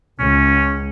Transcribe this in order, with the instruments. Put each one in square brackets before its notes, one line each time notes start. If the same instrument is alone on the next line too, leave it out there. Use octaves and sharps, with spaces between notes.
[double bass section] C#2 [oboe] C#4